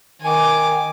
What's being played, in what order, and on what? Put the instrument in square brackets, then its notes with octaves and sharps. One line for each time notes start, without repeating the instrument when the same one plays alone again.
[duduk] D#3 [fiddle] G#5 D6